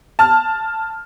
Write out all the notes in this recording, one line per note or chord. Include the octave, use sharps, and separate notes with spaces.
A5 F6